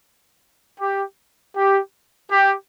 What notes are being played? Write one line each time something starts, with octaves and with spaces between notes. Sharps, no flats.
G4
G4
G4